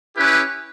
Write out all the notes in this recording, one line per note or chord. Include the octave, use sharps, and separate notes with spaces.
C#4 E4 G4 B4